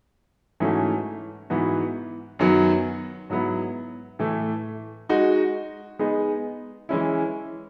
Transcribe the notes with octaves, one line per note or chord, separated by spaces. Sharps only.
G#2 E3 A3 C#4 F#4
G#2 E3 B3 F#4
F#2 D#3 F#3 B3
G#2 F#3 B3 E4
A2 E3 A3
G#3 D#4 F#4
G#3 B3 D#4 G#4
E3 G#3 C#4 E4